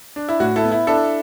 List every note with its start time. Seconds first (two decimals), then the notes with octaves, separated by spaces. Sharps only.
0.16 D4
0.29 E4
0.40 A2 F#4
0.56 E4 A4
0.64 B3
0.72 E4
0.87 D4 E4 A4